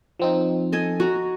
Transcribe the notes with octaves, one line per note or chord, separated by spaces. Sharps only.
F3 C4 D#4
A4 D#5 G#5
F#4 A#5